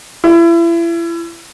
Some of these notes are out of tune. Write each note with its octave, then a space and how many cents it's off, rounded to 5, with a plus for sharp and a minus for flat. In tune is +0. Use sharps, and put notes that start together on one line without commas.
E4 +35